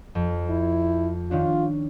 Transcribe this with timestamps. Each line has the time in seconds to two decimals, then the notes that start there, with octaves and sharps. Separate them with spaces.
0.15 F2
0.50 E4
1.31 D#3 C#4 D4 F4